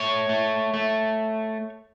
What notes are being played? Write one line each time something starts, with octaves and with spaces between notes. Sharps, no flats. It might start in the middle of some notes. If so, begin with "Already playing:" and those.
Already playing: A3 C#5
A3
A3